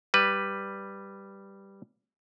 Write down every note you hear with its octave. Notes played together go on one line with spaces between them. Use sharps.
G3 B4